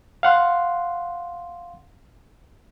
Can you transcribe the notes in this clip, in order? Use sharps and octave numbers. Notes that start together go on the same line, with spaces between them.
F5 F#5 C6